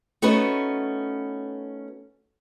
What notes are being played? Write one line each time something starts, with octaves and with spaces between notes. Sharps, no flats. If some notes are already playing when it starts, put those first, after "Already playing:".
A3 B3 C#4 D#4 F#4 B4